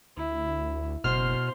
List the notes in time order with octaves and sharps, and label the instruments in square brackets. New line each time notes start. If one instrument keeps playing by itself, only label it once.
[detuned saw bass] D2 [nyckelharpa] E4
[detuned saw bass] F#1 [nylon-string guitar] B2 [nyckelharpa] C5 [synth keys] F6 C7